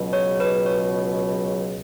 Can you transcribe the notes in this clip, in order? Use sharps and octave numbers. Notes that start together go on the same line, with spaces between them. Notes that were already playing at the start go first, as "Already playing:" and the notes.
Already playing: C#2 B2 F#3
C#5
B4
C#5